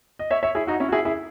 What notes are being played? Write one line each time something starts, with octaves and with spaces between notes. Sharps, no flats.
D#5
C#5 E5
C#5 E5
E4 G#4
D#4 F#4
C#4 E4
F#4
E4 G#4
E4 G#4